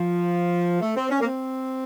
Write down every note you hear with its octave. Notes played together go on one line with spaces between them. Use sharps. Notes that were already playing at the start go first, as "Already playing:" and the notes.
Already playing: F3
A3
C4
C#4
A#3
C4